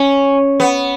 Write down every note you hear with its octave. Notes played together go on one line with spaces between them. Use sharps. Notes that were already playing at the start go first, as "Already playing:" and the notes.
Already playing: C#4
B3